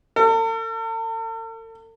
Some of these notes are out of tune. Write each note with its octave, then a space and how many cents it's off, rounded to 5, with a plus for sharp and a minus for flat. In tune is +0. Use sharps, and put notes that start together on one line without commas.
A4 +45